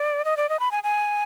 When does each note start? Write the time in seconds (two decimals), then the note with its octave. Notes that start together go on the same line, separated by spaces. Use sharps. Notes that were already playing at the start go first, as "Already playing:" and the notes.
Already playing: D5
0.25 D#5
0.37 D5
0.49 D#5
0.60 B5
0.72 G#5
0.84 G#5